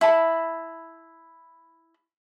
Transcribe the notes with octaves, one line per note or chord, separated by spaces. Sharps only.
E4 A5 B5